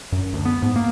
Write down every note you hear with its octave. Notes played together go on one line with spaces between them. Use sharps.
F#2
D2
B3
G#2
A#3